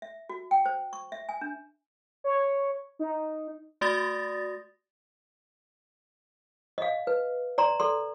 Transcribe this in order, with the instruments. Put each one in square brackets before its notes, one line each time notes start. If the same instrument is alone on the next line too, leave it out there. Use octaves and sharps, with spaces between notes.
[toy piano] E5
F#4
G5
C5
C#6
E5
G#5
D4
[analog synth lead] C#5
D#4
[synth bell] A3 F#4 D5 D#6 A6 A#6
[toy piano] D#5 F5
B4
D5 A#5 C6
A4 D5 C6